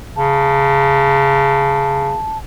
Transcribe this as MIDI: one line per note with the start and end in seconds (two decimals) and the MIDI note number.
0.16 2.16 49
0.16 2.38 81